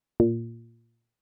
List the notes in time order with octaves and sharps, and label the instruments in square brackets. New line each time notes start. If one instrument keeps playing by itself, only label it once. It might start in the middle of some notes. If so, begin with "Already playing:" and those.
[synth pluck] A#2